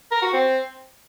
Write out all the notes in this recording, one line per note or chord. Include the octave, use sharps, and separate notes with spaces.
A#4
F#4
C4